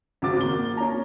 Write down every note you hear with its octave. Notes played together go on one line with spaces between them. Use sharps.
G#1 C#3 F#4 D6 A6
A#3 G7
C#4 A#5